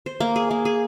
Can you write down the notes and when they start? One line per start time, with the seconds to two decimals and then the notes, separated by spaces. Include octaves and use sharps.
0.06 C5
0.20 A#3
0.36 G#4
0.51 A#3
0.65 G#4